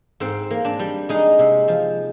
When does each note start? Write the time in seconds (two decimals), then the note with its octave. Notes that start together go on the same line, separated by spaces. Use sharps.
0.20 G#2 C4
0.50 A#3
0.65 D4
0.79 G3
1.09 G#3 D#4
1.39 C3
1.68 F3